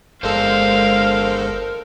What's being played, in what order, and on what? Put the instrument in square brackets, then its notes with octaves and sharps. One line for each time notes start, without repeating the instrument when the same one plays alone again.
[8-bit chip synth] G1 G#3 A4 [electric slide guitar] D4 C5 [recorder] A#4 [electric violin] F5